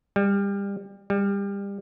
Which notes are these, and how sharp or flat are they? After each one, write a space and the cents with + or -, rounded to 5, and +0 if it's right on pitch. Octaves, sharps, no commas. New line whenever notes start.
G3 +30
G3 +30